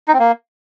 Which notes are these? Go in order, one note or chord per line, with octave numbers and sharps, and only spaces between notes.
D#4
C4
A#3